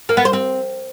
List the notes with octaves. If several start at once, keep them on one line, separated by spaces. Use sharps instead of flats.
A#3
B3
C5
C4